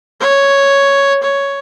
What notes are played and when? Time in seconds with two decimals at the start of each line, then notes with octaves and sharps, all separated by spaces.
0.20 C#5
1.22 C#5